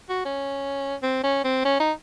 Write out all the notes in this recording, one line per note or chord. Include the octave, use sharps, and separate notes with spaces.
F#4
C#4
C4
C#4
C4
C#4
D#4